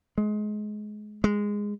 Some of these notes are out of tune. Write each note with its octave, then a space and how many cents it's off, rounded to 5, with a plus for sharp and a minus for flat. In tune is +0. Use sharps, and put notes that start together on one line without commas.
G#3 +25
G#3 -10